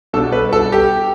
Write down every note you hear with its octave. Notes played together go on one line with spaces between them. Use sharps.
B2 G3 D4 A4
B4
A4
G4